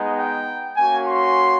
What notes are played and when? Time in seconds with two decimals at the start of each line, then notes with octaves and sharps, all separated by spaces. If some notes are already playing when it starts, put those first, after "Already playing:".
Already playing: G#3 B3 D#4
0.17 G5
0.77 A#3 C#4 F#4 G#5
1.07 C6